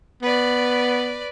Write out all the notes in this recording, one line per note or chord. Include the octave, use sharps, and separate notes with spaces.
B3 B4 D5